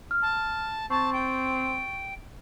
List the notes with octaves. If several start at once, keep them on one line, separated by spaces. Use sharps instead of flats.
F6
A5
C4 A5 C#6 A6
G5